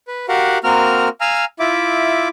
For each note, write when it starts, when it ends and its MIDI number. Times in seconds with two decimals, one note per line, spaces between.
0.08 0.26 71
0.29 0.58 66
0.29 0.58 67
0.29 0.58 70
0.29 0.58 77
0.29 0.58 78
0.64 1.09 58
0.64 1.09 60
0.64 1.09 66
0.64 1.09 70
0.64 1.09 82
0.64 1.09 89
1.21 1.45 77
1.21 1.45 80
1.21 1.45 82
1.21 1.45 88
1.21 1.45 89
1.59 2.28 64
1.59 2.28 65
1.59 2.28 76
1.59 2.28 86